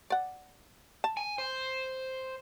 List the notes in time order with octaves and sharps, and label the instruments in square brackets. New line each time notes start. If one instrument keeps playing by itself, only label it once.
[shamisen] D5 F#5
A5
[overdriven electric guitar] G#5
C5